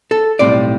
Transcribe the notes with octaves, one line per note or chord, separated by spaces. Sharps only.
A4
B1 A2 G3 C4 D5